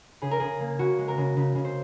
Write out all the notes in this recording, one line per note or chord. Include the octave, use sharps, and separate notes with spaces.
C#3 G#4
A#4
C#3 G#4
A#3
C#3 F#4
G#3
A#4
C#3
C#3
C#3
C5